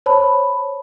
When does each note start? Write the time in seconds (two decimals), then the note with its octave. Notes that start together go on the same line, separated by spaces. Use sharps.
0.06 C5 C#5 A5 B5